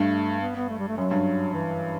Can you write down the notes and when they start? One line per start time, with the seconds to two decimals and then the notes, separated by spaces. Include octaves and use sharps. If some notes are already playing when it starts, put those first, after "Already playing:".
Already playing: G2 A3
0.41 B3
0.56 B3
0.69 A3
0.79 G3
0.88 A3
0.97 F#2 F#3
1.11 G2
1.53 E3